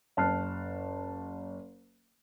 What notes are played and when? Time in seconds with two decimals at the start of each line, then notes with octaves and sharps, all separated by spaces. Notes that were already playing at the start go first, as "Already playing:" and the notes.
0.17 F#1 A5 F6 F#6 C7